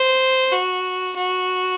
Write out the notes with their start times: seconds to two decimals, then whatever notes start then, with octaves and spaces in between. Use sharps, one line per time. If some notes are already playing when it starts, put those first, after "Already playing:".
Already playing: C5
0.52 F#4
1.16 F#4